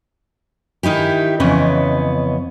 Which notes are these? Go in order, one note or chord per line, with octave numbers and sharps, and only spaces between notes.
D#3 D#4 E4 G4
F2 C#3 E3 B3 C#4 D#5